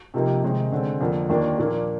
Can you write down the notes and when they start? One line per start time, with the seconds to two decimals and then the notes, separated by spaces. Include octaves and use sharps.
0.14 C3 F3 A#3 D#4 G4
0.43 C3 D#3 G#3 C4 D#4
0.72 D3 G#3 C4
1.01 F2 D3 F3 A#3
1.29 D#2 D#3 A#3 D4 F4
1.58 A#2 F3 A#3 D4